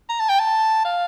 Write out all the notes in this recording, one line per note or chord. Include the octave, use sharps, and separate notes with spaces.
A#5
A5
G5
A5
F5